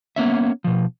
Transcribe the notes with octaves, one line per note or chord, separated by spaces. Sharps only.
A#3 B3 C#4 E5
B2 F3